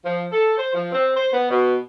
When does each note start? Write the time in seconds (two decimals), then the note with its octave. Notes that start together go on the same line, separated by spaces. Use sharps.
0.05 F3
0.32 A4
0.57 C5
0.74 F3
0.92 C4
1.16 C5
1.33 B3
1.49 B2